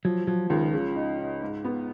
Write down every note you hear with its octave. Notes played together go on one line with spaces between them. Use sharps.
F3 F#3
F3 F#3
C#2 D#3
C#3
D#4
D#4
G#2
B3